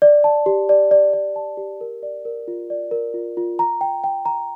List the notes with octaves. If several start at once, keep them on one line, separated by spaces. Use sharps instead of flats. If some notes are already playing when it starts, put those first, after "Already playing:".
D5
A5
G4
D5
D5
D5
A5
G4
A#4
D5
A#4
F4
D5
A#4
F4
F4
A#5
G5
G5
A#5